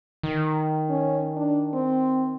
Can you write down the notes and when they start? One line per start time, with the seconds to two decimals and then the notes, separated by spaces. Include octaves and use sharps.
0.23 D#3
0.89 C#4
1.37 D4
1.73 C4